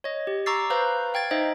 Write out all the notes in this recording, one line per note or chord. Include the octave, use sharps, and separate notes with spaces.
C#5 D#5
G4
A#5 C#6 D6 E6 A6 C7
B4 C5 F5 A#5 G6
F5 G5 G#6 A6
D#4 C5 D#5 E5 G5